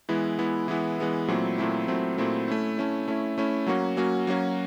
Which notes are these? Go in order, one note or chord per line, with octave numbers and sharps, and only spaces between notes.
E3 G#3 B3 E4
E3 G#3 B3 E4
E3 G#3 B3 E4
E3 G#3 B3 E4
A#2 F#3 A3 C4 E4
A#2 F#3 A3 C4 E4
A#2 F#3 A3 C4 E4
A#2 F#3 A3 C4 E4
A3 C#4 E4
A3 C#4 E4
A3 C#4 E4
A3 C#4 E4
F#3 A#3 C#4 F#4
F#3 A#3 C#4 F#4
F#3 A#3 C#4 F#4